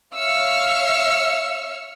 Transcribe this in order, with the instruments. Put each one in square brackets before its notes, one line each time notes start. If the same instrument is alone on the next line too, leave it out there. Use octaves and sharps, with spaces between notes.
[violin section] C#5 E5 F5 E6 F6 C#7